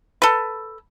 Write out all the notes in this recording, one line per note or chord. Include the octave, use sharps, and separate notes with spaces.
A4 B4